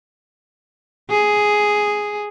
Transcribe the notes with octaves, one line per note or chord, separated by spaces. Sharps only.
G#4